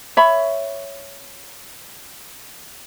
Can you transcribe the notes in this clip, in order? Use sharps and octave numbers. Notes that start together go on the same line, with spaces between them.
C#5 E5 B5